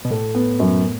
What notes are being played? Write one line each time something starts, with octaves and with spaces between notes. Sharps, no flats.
B2
A2 A4
B3
F#2